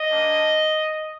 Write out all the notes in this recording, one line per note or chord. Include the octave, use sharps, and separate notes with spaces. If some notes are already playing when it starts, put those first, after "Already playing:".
Already playing: D#5
G3 A#3 D4